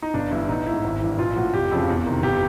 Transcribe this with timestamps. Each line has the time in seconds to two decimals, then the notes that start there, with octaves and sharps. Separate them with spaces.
0.02 D#4
0.14 G1 D4
0.31 G2 E3 E4
0.49 A1 D#4
0.67 G#2 E3 E4
0.84 G#1
1.01 G2 E3
1.19 A#1 F4
1.36 A2 F3 F#4
1.53 F1 G4
1.71 F2 C#3 F3
1.89 E2
2.06 C3 D#3
2.23 G1 G4